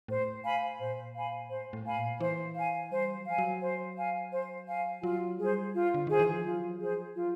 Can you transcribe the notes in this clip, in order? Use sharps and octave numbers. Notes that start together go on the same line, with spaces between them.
A2 C5
F5 G#5 B5
A#2 C5
F5 G#5 B5
A2 C5
A2
F5 G#5 B5
A#2
E3 C5
F5 G#5
G3 C5
F#3
F3 F5 G#5
F#3
C5
F5 G#5
C5
F5 G#5
F#3 F4
G3 G#4 C5
F4
D3
D#3 G#4 C5
E3
F3
F#3 F4
F3 G#4 C5
F#3 F4